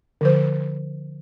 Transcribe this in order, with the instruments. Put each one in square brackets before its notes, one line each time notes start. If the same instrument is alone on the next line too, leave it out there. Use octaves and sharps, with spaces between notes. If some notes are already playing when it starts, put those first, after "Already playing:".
[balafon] D3 F3 C5